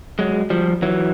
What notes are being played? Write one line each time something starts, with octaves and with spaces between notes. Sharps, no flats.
F#3 G#3
F3 G3
E3 F#3